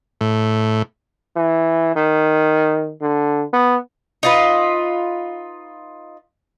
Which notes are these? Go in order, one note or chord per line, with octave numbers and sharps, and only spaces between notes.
A2
E3
D#3
D3
B3
D#4 F4 B4